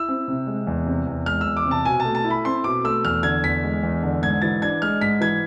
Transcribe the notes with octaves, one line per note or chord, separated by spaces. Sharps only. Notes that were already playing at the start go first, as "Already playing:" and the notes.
Already playing: E4 E6
C4
C3
G#3
E2
C3
E2
G#3 F6
E6
E2
D6
C3
A5
B2 G#5
A3 A5
A5
E4
B5
C4 C6
B2 D6
A3 E6
E2 F6
D3 G#6
E2 B6
G#3
E2
D3
G#2 G#6
E3 A6
D4 G#6
G#3 F6
G#2 B6
E3 G#6